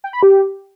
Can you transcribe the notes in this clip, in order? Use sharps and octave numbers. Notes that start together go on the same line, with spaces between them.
G5
B5
G4